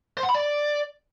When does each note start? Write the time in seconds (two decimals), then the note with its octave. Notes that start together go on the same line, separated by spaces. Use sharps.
0.17 C5
0.23 F#5
0.29 B5
0.35 D5